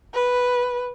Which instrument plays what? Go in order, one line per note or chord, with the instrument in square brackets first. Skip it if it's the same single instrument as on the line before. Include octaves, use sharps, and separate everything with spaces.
[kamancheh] B4